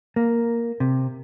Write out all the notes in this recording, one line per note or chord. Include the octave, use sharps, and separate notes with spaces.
A#3
C3